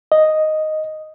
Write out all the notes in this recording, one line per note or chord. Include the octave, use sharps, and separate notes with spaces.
D#5